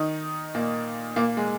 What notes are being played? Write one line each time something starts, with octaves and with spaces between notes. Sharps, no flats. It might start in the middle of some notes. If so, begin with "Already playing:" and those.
Already playing: D#3 D#4
A#2 A#3
A#2 A#3
G#3